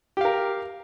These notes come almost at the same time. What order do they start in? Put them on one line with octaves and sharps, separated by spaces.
G4 F5 A#4